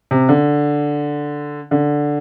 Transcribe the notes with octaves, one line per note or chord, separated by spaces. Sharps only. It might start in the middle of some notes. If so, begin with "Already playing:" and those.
C3
D3
D3